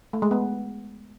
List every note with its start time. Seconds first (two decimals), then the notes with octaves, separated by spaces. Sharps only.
0.13 A3
0.22 G#3
0.31 B3